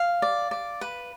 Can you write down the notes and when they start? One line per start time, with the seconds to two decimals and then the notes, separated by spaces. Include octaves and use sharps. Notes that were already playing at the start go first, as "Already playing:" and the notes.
Already playing: F5
0.22 D5
0.51 D5
0.81 B4